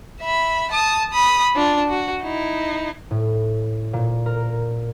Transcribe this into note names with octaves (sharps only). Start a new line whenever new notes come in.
E5 B5
A5 D#6
B5 D#6
D4 F4
F#4
D#4 E4
A2
A#2
A#4